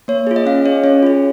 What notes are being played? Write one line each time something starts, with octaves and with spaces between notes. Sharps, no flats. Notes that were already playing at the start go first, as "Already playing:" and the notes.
A#3 C#5
F4 G#4
D#5
C#4 F5
G#4 C#5
C#4 C#5
F4 G#4